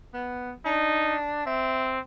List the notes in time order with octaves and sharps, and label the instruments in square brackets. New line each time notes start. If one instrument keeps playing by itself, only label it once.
[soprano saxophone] B3
[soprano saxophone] D4 [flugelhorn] D#4
[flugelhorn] C4 [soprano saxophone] E5